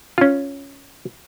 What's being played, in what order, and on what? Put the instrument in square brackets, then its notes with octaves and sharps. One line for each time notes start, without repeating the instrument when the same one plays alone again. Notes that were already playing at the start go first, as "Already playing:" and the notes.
[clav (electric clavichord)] C#4 F4